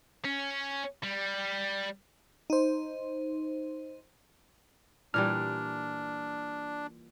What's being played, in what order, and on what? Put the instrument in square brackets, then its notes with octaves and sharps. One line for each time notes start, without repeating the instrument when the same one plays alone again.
[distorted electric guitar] C#4
G3
[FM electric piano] D#4 C5
[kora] A#2 E3 G3 [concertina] D4 [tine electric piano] F6